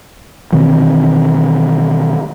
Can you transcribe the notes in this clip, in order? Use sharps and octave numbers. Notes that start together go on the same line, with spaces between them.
B2 D#3 E3 C4